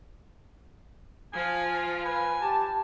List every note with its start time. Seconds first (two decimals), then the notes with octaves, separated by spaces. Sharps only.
1.33 F3 F4 G#5
2.04 B4 G#5
2.42 G4 A5